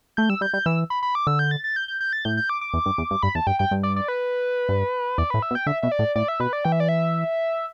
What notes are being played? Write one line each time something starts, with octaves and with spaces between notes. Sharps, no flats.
A3 G6
G3 E6
G3 G6
G3 G6
E3 E6
B5
B5
D6
D3 E6
G6
A6
A6
G6
G6
G6
A6
A2 G6
G6
D6
D6
E2
G2
E2
G2
G2 B5
E2 A5
G2 G5
G2 G5
G2
D5
D5
B4
G2
E2 D5
A2 B4
E5
B2
G5
D3 E5
B2 E5
D5
A2
A2 D5
E5
B2 B4
D5
E3 G5
E5
D5
E5